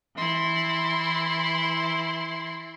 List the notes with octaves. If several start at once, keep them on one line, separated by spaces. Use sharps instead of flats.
E3 E4 C6